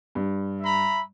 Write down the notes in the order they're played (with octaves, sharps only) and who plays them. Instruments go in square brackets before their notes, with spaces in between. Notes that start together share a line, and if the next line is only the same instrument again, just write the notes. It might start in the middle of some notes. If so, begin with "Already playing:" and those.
[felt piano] G2
[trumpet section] E5 A#5 B5